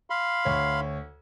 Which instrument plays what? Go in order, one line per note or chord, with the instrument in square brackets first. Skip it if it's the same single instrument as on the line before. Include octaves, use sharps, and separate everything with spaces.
[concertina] F5 B5 C6
[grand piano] D2 C#5